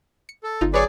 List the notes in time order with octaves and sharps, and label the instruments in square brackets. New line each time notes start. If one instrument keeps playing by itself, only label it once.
[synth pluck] C#7
[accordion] A4
[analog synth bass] G1 [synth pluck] D#4 F4
[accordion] F#3 G#4 D5 [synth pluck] B4 C#5 C#6